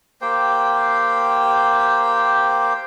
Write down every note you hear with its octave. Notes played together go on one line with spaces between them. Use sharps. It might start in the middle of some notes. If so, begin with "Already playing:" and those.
A#3 G4 C5 G5